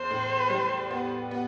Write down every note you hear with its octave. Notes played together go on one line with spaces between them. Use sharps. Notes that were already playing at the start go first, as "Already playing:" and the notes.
Already playing: E2 C5
A2
G3
B3
B3